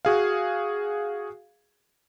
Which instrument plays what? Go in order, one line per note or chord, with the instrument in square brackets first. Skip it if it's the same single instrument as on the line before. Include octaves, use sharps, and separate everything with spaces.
[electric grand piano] F#4 G#4 F5